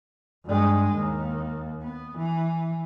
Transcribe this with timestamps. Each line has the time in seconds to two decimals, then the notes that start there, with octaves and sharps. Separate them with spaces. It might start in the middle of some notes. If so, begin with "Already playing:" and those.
0.45 G2 G#3
0.94 D#2
1.82 B3
2.18 E3